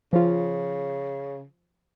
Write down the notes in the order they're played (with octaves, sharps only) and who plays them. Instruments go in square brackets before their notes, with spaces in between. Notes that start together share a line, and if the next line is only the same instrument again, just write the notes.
[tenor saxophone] C#3 [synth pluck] F3 F4